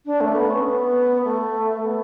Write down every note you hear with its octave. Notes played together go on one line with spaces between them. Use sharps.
D4
A3
B3
C#4
B3
A3
B3